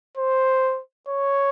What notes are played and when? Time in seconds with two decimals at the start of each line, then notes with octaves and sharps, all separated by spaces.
0.18 C5
1.08 C#5